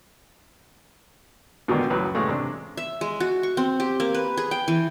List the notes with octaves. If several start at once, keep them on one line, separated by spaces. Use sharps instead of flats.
G#2 B2 D3 D#3
C#2 F#2 A2 B4
A2 C#3 E3 G#3 A3
C3 D4
E5
G#3
F#4
C#6
C4
G4
A#3
B4
G#4
G5
E3